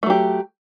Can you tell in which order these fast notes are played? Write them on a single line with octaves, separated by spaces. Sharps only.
A3 F#3 G4